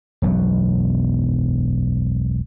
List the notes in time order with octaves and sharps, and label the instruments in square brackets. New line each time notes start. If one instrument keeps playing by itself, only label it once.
[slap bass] E1 B1 F#2 F#3